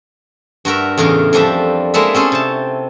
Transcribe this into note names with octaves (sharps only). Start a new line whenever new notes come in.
G2 F#4 A#4 E5
E2 A2 C#3 A#4
F2 F3 G3 D4 E5
G#3 A#3 E4 A4 E5
C4 C#4 G#4 A4
C3 A5